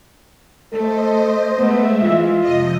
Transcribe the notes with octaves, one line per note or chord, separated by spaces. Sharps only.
A3 A4 C5 D#5
G#3 A3 B3 E5
E3 F4
F2 C3 F3 D#5